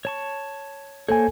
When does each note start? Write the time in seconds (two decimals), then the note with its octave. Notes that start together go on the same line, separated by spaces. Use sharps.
0.05 C#5 A5 C#6
1.08 A#3 A4 C5 C#5 G#5